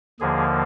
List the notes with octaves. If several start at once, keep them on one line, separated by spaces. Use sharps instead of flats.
D#2 D3 F3 A#3 G#4